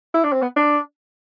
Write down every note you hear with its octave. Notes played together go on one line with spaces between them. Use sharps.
E4
D4
C4
B3
D4